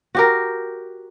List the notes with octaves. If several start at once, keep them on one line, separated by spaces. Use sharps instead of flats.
F#4 G4 A#4